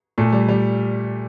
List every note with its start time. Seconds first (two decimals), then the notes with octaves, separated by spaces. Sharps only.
0.18 A#2 A3
0.32 G3
0.49 G3